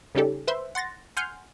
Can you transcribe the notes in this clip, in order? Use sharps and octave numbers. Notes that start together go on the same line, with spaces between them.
C#3 G3 C#4 D#4 G4 A4
B4 C5 E5 C6
F#5 C6 A6 A#6
F#5 G#5 C6 F6 G6